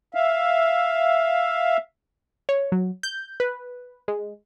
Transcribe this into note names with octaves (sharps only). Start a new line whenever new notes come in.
E5 F5
C#5
F#3
G6
B4
G#3